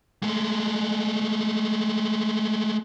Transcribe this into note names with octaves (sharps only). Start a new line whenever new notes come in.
G#3 A3